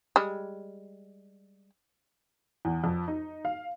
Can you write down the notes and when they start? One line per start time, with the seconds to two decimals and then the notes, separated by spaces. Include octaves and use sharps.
0.16 G3 G#3
2.65 E2
2.84 F2
3.08 D#4
3.45 F5